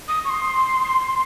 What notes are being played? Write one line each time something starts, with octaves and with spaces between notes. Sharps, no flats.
D#6
C#6
C6